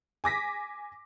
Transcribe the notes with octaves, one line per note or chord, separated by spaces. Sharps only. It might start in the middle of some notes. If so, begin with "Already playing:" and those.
G#5 D6 A#6 B6